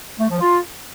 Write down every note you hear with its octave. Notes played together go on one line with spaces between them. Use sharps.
A3
F3
F4